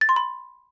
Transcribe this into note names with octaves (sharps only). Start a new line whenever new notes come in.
A6
C6
B5